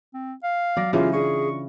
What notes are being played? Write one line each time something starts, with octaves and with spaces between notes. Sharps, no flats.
C4
F5
F#3 D5 A#6
C#3 E3 F#3 G#3 C#4 F4 G4
D4 F4 G#4 C#6